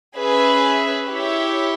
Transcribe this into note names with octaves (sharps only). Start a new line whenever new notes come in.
C#4 G#4 B4 E5
E4 G4 C#5 E5